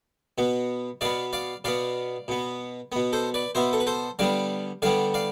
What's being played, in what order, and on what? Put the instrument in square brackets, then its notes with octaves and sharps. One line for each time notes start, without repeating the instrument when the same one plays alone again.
[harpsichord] B2 B3
B2 B3 D5 F5
D5 F5
B2 B3 D5 F5
B2 B3
B2 B3
A4 C5
B4 D5
B2 B3 C5 E5
A4
B4
A4 C5
D3 G3 B3 D5 F5
D3 G3 B3 D5 F5
D5 F5